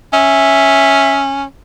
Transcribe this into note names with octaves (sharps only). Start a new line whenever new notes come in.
C#4 E5